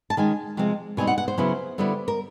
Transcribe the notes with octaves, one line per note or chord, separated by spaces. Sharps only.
A5
D#3 G#3 C#4 G#5
C3 F3 G#3 C4
B2 G3 C4 D#4 G#5
F#5
F#5
C5
C#3 F#3 B3 E4
D3 G3 B3 E4
A#4